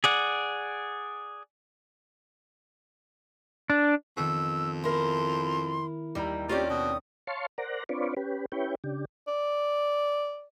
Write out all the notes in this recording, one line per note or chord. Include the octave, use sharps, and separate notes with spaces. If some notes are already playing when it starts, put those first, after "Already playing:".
G#4 D5 F#5
D4
F2 D#3 B3 E6
E4 A#4 C6
D#2 G3 E4 A#5
C4 C#4 F4 G4 D5
B2 D#6
C#5 F5 A5 C6 C#6
A#4 C5 D5 F#5 A#5
C4 D4 F4 B4 C#5 D5
C#4 G4 B4
C#4 E4 G4 B4 C#5 G5
C#3 D4 G4
D5